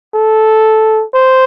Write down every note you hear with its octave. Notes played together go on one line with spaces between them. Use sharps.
A4
C5